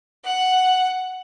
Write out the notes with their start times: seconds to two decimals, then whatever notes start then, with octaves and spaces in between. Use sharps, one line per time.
0.25 F#5